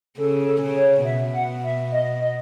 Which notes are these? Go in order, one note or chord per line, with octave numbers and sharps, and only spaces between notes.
C#3 A4
A4
C#3
C#5
B2 E5
F#5
E5
D#5
D#5